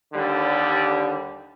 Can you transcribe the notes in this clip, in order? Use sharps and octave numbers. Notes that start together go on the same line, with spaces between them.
D#2 D3 G3